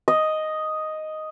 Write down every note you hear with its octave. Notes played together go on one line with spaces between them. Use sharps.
D#5